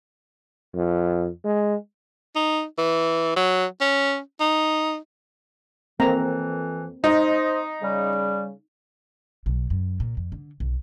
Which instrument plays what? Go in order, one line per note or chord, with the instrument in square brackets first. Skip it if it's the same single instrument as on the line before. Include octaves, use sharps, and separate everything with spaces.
[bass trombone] F2
G#3
[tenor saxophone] D#4
E3
F#3
C#4
D#4
[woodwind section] F2 E3 [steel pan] A#3 C4 A#5
[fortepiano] D#4 [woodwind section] C5 D#5
[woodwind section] C#3 G3
[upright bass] B1
F#2
A#2
F2
D3
B1